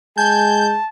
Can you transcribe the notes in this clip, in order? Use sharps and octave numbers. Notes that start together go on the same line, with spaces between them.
G#3 G#5 A5 G6